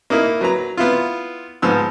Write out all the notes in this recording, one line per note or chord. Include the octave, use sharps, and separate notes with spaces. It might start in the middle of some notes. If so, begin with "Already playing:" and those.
A#3 D#4 E4
F#3 B4 A#5
B3 E4 F4
G#2 F3 B3 E6